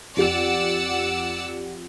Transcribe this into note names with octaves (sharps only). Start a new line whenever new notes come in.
F2 G4 D5 F#5 E6 F7